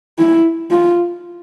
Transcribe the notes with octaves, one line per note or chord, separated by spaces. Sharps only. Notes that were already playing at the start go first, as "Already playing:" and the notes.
E4
F4